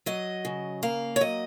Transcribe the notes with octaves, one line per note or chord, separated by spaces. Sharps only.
F#3 D#5
C#3
A#3 F5
C#5
F#3 D#5